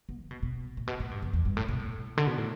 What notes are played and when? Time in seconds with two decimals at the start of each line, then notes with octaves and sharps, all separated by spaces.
0.09 B3
0.20 D3
0.31 B2
0.43 B2
0.77 A2
0.87 B2
1.00 A2
1.11 G2
1.22 E2
1.33 E2
1.45 G2
1.57 A2
1.68 B2
1.79 A2
2.17 D3
2.27 B2
2.38 A2